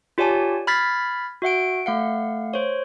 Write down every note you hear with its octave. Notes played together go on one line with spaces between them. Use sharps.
F4 G4 C#5 D5 G#5 A5
B5 F6 G#6 A6 B6 C7
F#4 E5 F#5 D7
A3 F5 F#5
C5 C#5